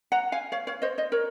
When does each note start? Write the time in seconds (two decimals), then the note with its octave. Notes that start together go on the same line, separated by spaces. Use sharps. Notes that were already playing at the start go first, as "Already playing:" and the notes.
0.12 F#5 A#5
0.32 F5 G#5
0.52 C#5 F5
0.67 C#5 F5
0.82 C5 D#5
0.98 C5 D#5
1.12 A#4 C#5